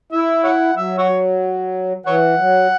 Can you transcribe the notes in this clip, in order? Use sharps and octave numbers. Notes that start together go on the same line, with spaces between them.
E4 E5
C#5 F#5
F#3 E5
F#4 C#5
E3 C#5 F#5
F#3